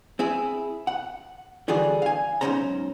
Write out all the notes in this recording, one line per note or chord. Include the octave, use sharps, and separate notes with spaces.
C4 E4 G#4
F#5
D3 E3 G3 F#4 G#4 D5
F5 G#5
B1 E2 G#2 C#4 C5 A#5